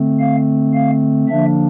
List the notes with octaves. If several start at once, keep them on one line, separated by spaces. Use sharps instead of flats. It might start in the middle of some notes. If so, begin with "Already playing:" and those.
Already playing: D3 A3 C4
F5
F5
D3 F3 A#3 D4 E5